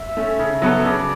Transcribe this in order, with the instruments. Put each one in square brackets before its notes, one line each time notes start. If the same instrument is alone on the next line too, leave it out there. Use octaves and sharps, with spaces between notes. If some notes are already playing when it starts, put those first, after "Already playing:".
Already playing: [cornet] E5
[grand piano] A3 C#4
C#3
F#3 B3 F#4 A4
[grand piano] C#3 [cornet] D5